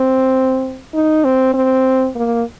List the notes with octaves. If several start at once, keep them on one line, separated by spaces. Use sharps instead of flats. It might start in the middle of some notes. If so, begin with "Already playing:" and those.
Already playing: C4
D#4
C4
C4
A#3